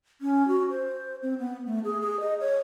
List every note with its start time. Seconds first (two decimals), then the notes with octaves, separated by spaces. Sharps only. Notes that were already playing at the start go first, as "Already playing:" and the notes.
0.21 C#4
0.48 F#4
0.70 C5
1.22 C4
1.39 B3
1.66 A3
1.84 G#4
2.01 G#4
2.20 D#5
2.40 C#5